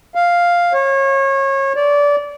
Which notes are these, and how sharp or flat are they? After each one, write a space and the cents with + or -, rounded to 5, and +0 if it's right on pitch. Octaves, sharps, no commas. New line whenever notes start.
F5 +0
C#5 -30
D5 -20